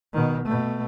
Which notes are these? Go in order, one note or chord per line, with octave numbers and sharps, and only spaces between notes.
B2 D#3
B2 A3